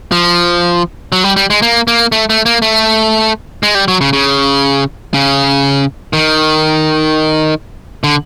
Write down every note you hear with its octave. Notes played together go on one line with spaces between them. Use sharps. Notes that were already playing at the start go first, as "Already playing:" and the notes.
F3
F#3
G3
G3
G#3
A#3
A#3
A3
A3
A#3
A3
G#3
G3
F#3
C#3
C#3
C#3
D#3
D3